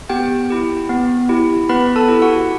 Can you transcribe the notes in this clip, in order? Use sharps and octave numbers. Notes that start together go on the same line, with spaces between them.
B3 G4 G5
E4 G4
B3
E4 G4
B3 B4 B5
A4 A5
E4 G4
F#4 F#5